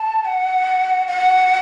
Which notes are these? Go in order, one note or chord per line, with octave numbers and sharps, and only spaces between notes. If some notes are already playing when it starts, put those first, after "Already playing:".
Already playing: A5
F#5
F#5